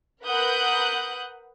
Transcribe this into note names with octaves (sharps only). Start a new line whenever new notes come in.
A#4 B4 F#5 D#6 F#6 G6